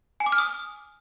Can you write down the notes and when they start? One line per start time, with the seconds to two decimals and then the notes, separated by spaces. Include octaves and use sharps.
0.20 G#5
0.26 D6
0.32 F6
0.38 D#6